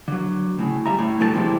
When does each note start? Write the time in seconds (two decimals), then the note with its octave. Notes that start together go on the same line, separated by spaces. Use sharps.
0.08 D3 F#3
0.59 A2 C#3
0.86 G3 E5 A#5
0.99 A2
1.19 G2 B2 F#3 A3 G4 A5
1.34 C3 E3 F3 G3 G#3 E4